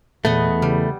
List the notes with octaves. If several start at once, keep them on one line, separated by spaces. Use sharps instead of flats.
E2 A#2 A3 B3 D#5
C#3 G3